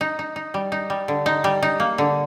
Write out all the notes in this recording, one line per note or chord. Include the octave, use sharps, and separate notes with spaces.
D#4
D#4
D#4
G3
D#4
G3
D3
D#4
G3
D#4
A#3
D3